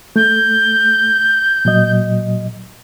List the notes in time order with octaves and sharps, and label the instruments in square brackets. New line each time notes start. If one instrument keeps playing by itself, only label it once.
[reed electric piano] A3 [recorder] G6
[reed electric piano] A#2 F#3 D#5